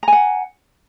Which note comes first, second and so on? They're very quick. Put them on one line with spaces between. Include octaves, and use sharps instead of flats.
A#5 G#5 F#5